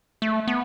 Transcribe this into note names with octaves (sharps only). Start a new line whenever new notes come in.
A3
B3